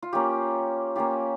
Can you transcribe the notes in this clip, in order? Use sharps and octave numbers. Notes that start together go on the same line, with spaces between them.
F4
A#3 C#4 F4 G4
A#3 C#4 F4 G4